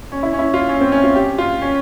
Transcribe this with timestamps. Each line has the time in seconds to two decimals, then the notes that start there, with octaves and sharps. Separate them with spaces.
0.12 C#4
0.23 E4
0.33 C#4
0.39 E4
0.54 F4
0.69 C#4
0.81 C4
0.92 C#4
1.04 F4
1.15 G4
1.38 F4
1.62 C#4